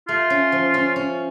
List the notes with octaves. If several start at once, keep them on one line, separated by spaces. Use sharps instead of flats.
A3 F4
C#4
F3
C#4
C#4